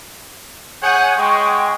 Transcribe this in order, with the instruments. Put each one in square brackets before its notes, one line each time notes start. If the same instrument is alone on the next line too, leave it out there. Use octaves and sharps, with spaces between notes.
[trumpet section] G#4 C#5 F#5 [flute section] G#5 G6
[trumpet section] G#3 [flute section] G5 C#6